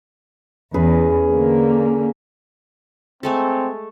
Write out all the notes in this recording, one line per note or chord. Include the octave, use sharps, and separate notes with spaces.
E2 C#4 G#4 B4
D3 A#3
G#3 A3 C4 A4